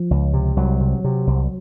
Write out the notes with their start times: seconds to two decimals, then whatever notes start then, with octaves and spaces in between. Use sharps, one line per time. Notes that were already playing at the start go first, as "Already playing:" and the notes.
Already playing: F3
0.11 C#2
0.34 C3
0.57 C2 F#3
0.81 C3
1.04 C3
1.27 C2